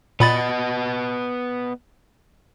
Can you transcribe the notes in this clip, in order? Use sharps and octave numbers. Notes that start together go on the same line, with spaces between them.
A#2 B3 D#5 B5 A6